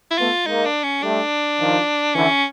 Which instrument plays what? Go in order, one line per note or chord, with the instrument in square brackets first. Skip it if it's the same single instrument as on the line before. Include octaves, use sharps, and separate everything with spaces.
[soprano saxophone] E4
[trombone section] A3 B3 [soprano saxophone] F4
[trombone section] G#3 A#3 [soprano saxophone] D#4
[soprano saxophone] D4
C#4
[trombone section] G3 A3 [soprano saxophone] D4
[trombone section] D#3 F3
[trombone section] D3 E3 [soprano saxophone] C#4